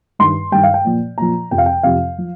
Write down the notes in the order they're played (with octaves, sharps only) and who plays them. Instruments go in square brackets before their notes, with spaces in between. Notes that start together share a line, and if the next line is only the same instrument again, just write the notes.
[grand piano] G2 D#3 G3 C6
G2 D#3 G3 G5
F5
G5
A#2 F3
A#2 F3 A#5
F2 C3 F3 G5
F5
G5
F2 C3 F3 F5
F3